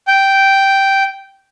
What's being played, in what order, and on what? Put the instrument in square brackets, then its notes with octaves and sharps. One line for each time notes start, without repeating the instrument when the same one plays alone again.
[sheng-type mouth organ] G5